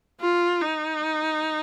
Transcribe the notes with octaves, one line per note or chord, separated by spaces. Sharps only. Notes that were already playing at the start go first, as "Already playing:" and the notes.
F4
D#4